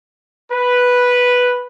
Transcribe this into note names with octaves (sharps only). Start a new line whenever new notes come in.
B4